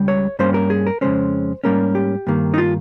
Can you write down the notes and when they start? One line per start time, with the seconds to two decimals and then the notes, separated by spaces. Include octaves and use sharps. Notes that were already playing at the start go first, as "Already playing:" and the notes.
Already playing: C#2 C#3 G3
0.08 C#5
0.39 G2 G3 A#3 C#4 C5
0.54 A#4
0.70 G#4
0.87 A#4
1.01 F2 C#3 G#3 C#4 C5
1.64 G#2 G3 A#3 C#4 A#4
1.95 G4
2.27 G2 D#3 A#3
2.54 D#4
2.58 F4